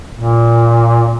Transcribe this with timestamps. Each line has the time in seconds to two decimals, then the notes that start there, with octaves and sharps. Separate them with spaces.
0.17 A#2